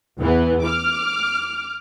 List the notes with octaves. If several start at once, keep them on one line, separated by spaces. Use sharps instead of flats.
E2 E3 B3
D6 F6